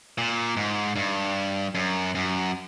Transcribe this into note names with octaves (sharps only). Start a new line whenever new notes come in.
A#2
G#2
G2
F#2
F#2